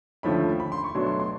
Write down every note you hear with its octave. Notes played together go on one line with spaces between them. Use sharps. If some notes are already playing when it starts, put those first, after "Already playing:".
D#2 D3 F3 A3 C#4 B5
B5
C6
C#6
B2 F#3 A3 D4 C6
C6
C6